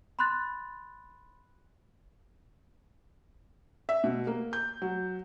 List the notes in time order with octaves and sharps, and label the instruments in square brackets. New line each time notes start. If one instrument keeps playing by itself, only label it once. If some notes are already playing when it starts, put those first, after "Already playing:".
[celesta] B5 C6 F#6 A6
[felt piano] E5
B2
A#3
G6
F#3